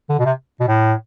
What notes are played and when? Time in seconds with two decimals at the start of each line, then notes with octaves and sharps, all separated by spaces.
0.09 D3
0.19 B2
0.25 C3
0.60 B2
0.68 A2